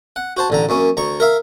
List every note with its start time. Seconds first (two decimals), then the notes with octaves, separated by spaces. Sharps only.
0.16 F#5
0.37 F#4 C5 A5
0.50 A1 D3 A#5
0.69 F#2 A#3 C#4
0.97 D2 A#5 C#6
1.20 A#4 E5 F5